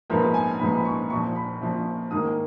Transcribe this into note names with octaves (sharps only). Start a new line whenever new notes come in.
A#1 G#2 F3 B3 A#4
G#5
A#1 G#2 F3 B3 B5
B5
C#6
A#1 A#2 F3 C#6
B5
A#1 A#2 F3
G#2 D#3 A#3 D#6